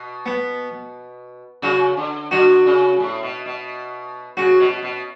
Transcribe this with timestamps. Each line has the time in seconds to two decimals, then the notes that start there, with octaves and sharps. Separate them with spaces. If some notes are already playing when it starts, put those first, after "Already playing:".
Already playing: B2
0.26 B3
1.62 C#3 F#4
1.97 D3
2.31 D3 F#4
2.66 C#3
3.00 A2
3.23 B2
3.46 B2
4.37 C#3 F#4
4.60 B2
4.83 B2